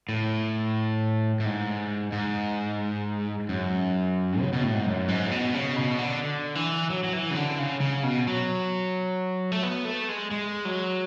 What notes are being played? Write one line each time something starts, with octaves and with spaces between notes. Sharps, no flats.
A2
A2
G#2
G#2
F#2
C#3
B2
A2
G#2
F#2
G#2
A2
B2
C#3
B2
D3
D3
E3
F#3
F#3
E3
C#3
D3
C#3
C#3
B2
F#3
A3
B3
A3
G#3
G#3
F#3